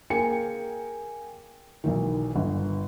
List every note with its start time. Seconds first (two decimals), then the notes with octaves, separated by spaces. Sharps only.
0.10 A#3 G#4 A#4 G5 G#5 C#7
1.84 B1 E2 D#3
2.36 G1